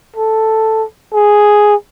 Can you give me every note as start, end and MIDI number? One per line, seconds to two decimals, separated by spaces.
0.16 0.84 69
1.13 1.75 68